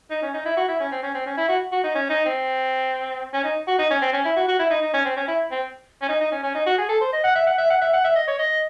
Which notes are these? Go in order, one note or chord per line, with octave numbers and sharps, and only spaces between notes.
D#4
C#4
D#4
E4
F#4
E4
C#4
C4
C#4
C4
C#4
E4
F#4
F#4
D#4
C#4
D#4
C4
C#4
D#4
F#4
D#4
C#4
C4
C#4
E4
F#4
F#4
E4
D#4
D#4
C#4
C4
C#4
E4
C4
C#4
D#4
D#4
C#4
C#4
D#4
F#4
G#4
A4
C5
D#5
F#5
E5
F#5
E5
F#5
E5
F#5
E5
D#5
C#5
D#5